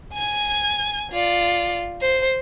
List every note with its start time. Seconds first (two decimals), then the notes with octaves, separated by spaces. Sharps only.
0.13 G#5 G#6
1.12 F4 D5
2.01 C5